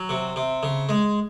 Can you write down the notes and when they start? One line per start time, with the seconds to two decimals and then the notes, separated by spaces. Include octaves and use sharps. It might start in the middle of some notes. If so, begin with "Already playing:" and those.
Already playing: F#3
0.09 C3
0.36 C3
0.63 C#3
0.89 G#3